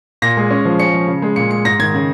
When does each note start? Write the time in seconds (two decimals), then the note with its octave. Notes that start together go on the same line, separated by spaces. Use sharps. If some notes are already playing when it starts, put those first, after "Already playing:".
0.22 A#2 A#6
0.37 G#3
0.50 C#4
0.65 F3
0.79 C#4 C#7
0.94 F3
1.07 C#3
1.22 G#3
1.36 A#2 C#7
1.51 G#3 C#7
1.65 G#2 A#6
1.79 D#3 G#6
1.94 C#3